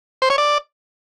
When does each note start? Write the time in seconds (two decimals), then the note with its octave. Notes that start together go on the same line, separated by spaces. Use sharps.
0.22 C5
0.30 C#5
0.38 D5